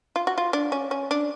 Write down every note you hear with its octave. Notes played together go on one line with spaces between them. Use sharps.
F4
F#4
F4
D4
C#4
C#4
D4